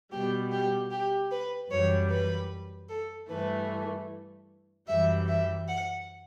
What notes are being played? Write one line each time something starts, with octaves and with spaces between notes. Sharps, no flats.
B2 G3 G4
G4
G4
B4
F#2 E3 G3 C#5
B4
A4
G2 E3 A3 B4
F#2 E3 G3 E5
E5
F#5